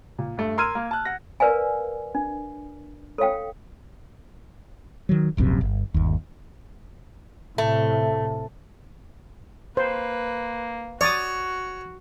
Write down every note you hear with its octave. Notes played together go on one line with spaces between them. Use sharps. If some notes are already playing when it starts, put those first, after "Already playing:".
A#2
G2 A3
A#4 C6 E6 F6 G#6 D#7
A#3
A5 F#6
F#5 A#6
A#4 B4 D5 F5 G#5
D4
A4 C#5 F5 G5
D#3 F#3
D1 A#1 F#2 C3
G1
G1 D#2
A2 C3 A3
A#3 B4 C5
F#4 C#5 D5 D#6